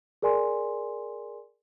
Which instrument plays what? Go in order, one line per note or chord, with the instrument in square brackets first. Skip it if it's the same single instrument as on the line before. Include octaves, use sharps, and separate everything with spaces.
[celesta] G#4 A#4 D5 G#5 C6